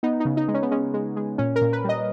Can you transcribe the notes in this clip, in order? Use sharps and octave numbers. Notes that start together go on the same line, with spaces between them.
B3 D#4
D#4
C#3
D#4
G#3
C#4
B3
G#3 C#4
G#3
G#3
A#2 C#4
A#4
A#2
B4
G3 D#5